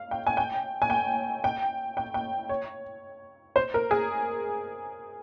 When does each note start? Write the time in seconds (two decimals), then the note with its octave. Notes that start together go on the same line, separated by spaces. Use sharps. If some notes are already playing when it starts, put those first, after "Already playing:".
Already playing: F5
0.11 G5
0.27 G#5
0.37 G5
0.82 G#5
0.90 G5
1.44 G5
1.97 G5
2.14 G5
2.49 C#5
3.56 C5
3.74 A#4
3.91 G#4